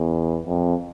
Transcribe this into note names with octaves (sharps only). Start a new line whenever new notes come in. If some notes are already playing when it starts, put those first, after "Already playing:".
Already playing: E2
F2